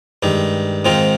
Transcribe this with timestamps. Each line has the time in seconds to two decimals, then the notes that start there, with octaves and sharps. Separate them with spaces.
0.23 G2 D#3 G#3
0.85 G#2 D#3 G#3 C4 F4